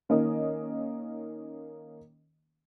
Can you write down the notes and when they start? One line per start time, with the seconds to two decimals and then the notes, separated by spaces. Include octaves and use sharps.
0.09 D#3 A#3 C#4 D#5